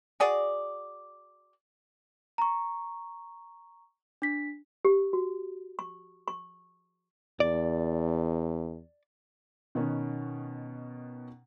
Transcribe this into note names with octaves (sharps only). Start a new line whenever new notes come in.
F#4 G#4 D5
A#5 C#6
D4 B6
G4
F#4
C#6
C#6
E2 D5
B2 D#3 B3 C#4